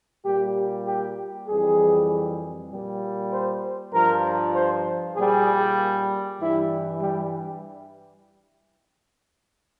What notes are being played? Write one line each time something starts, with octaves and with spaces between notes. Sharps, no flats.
A#2 G3 G4
G4
F2 E3 G3 G#4
A#2 G3
C5
G2 F3 A#4
C5
A#2 G#4
G3
G2 E3 G3 E4
G3